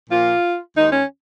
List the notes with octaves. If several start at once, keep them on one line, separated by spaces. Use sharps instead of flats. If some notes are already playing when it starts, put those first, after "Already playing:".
A#2 F3 A#3 F4
D#2 D#3 G#3 D#4
C#4